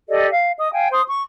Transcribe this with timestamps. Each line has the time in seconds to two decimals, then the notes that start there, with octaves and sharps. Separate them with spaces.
0.09 G4 A4 D5 D#5
0.29 F5
0.58 D#5 D#6
0.72 F5 G5 G#5
0.91 C5 C6 D#6
1.07 C#6